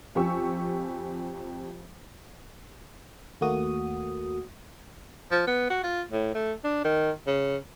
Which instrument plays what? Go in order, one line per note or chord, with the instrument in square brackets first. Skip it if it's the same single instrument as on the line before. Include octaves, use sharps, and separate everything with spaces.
[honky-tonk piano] F2 F4 G4 G#5 C#6 E6
[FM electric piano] D#2 A3 A#3 F#4 D#6
[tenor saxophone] F3
B3
F#4
F4
A2
A3
D4
D#3
C#3